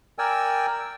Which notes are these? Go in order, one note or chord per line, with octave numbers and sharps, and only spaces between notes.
A#4 D5 G5 G#5 E6